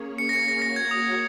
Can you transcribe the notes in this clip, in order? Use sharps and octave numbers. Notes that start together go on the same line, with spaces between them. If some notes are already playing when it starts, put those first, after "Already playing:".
Already playing: A#3 C#4 G#4 C#5
C#7
A#6
C#7
A#6
A#3 F#4 C#5 A#6
G#6
D#6